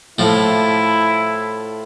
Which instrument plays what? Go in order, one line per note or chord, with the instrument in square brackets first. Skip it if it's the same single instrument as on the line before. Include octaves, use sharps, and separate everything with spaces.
[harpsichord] A2 F3 [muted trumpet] E4